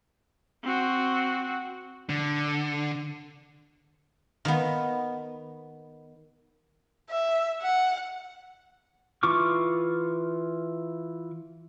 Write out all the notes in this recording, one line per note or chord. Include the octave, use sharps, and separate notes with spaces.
C4 F#4
D3
D#3 B3
E5
F#5
E3 F4 C#6 D6 F6